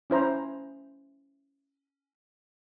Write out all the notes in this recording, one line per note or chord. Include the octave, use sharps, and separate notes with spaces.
C#4 E4 C5 A#5